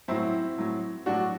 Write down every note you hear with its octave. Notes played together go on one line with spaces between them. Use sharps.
A2 F#3 C4 E4
A2 F#3
A2 F#3 D4 F#4